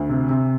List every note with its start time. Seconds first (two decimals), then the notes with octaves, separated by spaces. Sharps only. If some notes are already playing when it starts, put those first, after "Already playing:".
Already playing: D2
0.09 C3
0.29 C3